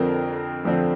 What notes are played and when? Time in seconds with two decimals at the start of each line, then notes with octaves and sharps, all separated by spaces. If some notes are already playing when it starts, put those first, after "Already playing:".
Already playing: F2 D3 F3 C4 A#4
0.65 F2 D3 F3 C4